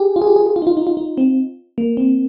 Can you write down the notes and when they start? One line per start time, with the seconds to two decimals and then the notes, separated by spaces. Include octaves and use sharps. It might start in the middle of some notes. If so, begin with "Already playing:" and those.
Already playing: G4 G#4
0.16 F4
0.22 G#4
0.27 G4
0.36 G#4
0.46 G#4
0.56 F4
0.62 D#4
0.67 F4
0.77 D#4
0.87 F4
0.97 D#4
1.18 C4
1.78 A#3
1.97 C4